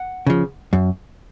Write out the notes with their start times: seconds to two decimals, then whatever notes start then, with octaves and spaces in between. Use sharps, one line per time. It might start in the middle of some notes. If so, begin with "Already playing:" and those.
Already playing: F#5
0.27 C#3 F3
0.73 F#2